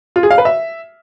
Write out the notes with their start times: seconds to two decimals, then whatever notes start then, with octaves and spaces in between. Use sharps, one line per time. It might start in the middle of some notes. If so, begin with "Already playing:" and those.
0.16 F4
0.23 G#4
0.31 F5
0.38 B4
0.45 E5